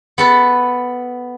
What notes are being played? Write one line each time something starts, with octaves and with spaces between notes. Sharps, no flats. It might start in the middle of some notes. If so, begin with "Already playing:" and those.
B3 A4 B4